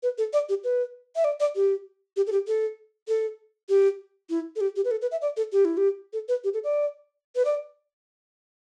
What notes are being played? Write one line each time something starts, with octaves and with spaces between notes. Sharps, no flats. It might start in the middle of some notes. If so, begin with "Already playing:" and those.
B4
A4
D5
G4
B4
E5
D5
D5
G4
G4
A4
G4
A4
A4
G4
E4
A4
G4
G4
B4
A4
B4
E5
D5
A4
G4
E4
G4
A4
B4
G4
A4
D5
B4
D5